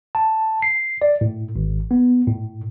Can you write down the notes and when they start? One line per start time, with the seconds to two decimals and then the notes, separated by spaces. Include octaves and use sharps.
0.15 A5
0.62 C7
1.02 D5
1.21 A2
1.56 G#1
1.91 B3
2.28 A2